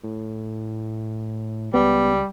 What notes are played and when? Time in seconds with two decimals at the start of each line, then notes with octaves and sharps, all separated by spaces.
0.04 A2
1.74 C#2 G3 B3